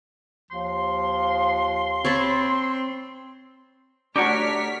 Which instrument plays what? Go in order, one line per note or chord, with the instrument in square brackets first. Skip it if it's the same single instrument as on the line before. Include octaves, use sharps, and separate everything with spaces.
[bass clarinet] D#2 [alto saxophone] F3 [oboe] C6
[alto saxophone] C4 [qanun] C#5 A5 B5
[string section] A3 F6 B6 [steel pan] D4 F#4 [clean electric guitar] G4 A#4 C#5